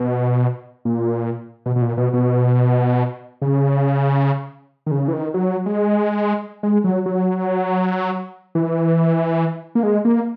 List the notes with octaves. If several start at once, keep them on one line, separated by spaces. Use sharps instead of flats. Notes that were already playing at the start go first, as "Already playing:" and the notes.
Already playing: B2
A#2
B2
B2
A#2
B2
B2
C#3
D#3
C#3
E3
D#3
F#3
G#3
G#3
F#3
F#3
E3
A#3
G#3
A#3